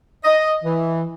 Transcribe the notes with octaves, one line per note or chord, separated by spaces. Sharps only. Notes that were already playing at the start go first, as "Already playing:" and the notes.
D#5
E3